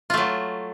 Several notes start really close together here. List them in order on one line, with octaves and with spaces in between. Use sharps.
F4 A3 F#3